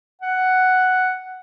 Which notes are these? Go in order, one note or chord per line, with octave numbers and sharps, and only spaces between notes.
F#5